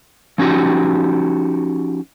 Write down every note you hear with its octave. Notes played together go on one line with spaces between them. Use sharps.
F3 C#4 D#4 F#4 G4